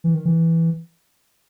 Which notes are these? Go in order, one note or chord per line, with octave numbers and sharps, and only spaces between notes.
E3
D#3
E3